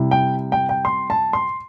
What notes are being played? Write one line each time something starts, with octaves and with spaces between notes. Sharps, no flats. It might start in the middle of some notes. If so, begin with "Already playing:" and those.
Already playing: C3 G3 E4
G5
G5
G5
C6
A5
C6